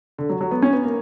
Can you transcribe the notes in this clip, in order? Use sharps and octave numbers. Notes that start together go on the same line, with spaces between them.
D3
F#3
F#3
B3
C#4
B3
A#3